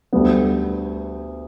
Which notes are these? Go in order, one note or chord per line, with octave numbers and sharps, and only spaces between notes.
D2 D3 G3 B3